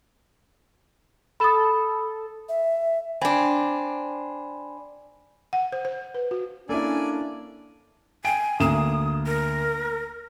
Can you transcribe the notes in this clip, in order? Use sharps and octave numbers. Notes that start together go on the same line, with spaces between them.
A4 B5 D#6
E5
C4 D4 G#5 B5
F#5
C5
C5
B4
F#4
A#3 C#4 D4 E4 A4 D5 G#5
G5 G#5 D7
D2 A#3 D#6 E7
A#4